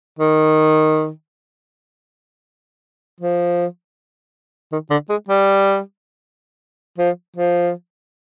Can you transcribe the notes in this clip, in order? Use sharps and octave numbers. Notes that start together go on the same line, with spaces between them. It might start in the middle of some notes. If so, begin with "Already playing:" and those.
D#3
F3
D#3
D3
G#3
G3
F3
F3